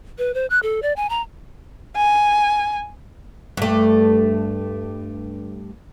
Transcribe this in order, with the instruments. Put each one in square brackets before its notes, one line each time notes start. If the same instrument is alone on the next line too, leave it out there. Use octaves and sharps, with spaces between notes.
[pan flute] B4
C5
F#6
A4
D5
G#5
A#5
[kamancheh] G#5
[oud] G2 A3